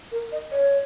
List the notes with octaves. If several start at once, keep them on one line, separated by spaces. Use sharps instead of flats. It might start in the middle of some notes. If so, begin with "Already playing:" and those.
A#4
D#5
C#5